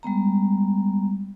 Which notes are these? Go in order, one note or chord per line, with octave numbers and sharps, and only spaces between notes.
G3 G#3 B3 A#5